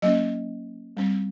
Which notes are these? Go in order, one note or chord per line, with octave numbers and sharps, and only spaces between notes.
F#3 A#3 C#4 D#5
G3 C4